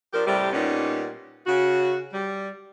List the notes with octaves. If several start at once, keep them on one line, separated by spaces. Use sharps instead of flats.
F3 D4 G4 A#4
A2 C3 G3
A#2 G3 B3 C#4 D#4
C#3 F#4
G3